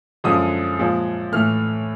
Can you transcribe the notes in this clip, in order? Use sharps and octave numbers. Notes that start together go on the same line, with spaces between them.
F#2 D3 F3 G#3 D#6
A#2 F3 G#3
A2 E3 A3 F6